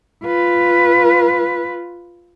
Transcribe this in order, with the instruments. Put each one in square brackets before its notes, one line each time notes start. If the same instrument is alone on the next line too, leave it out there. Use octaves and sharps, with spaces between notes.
[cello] F4 B4